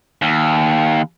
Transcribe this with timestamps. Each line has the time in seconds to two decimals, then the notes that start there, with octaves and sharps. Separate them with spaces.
0.22 D#2